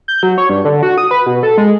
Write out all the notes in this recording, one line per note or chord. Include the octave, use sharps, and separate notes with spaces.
G6
F#3
C#5
G2
D3
F#4
D#6
B4
B2
A4
G#3